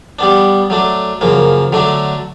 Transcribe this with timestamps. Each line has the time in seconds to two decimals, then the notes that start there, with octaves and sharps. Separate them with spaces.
0.19 G3 B3 D4
0.70 F#3 A3 D4
1.21 F#2 C#3 F3 A#3
1.72 D3 F#3 A3 D4 F#4